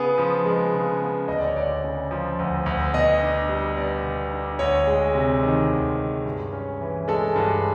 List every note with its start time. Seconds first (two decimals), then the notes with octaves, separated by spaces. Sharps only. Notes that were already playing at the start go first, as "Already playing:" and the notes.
Already playing: C#3 B3 G#4
0.18 F3
0.46 G#3
0.74 C#3
1.01 B3
1.28 D2 D#5
1.38 D5
1.47 C#5
1.56 D2 D5
1.84 C#3
2.11 F3
2.39 D2
2.66 D2
2.93 B2 D#5
3.22 D4
3.49 G3
3.77 B3 D5
4.04 B2
4.32 D4
4.59 D2 C#5
4.87 G#3
5.15 C3
5.43 D#3
5.70 D2
5.97 G#3
6.26 G2
6.53 C#4
6.81 E3
7.08 G#3 A4
7.36 G2